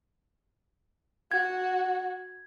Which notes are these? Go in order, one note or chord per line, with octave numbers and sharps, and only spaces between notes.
F#4 G#6